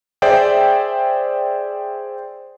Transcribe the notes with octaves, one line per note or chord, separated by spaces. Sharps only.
G#4 C5 D5 E5 G5